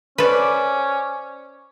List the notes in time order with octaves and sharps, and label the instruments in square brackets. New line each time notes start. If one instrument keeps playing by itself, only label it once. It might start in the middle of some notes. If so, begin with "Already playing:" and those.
[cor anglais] C#4 [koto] A4 B4 [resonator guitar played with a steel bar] C5 D5